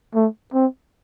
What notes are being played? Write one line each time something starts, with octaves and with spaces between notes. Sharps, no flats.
A3
C4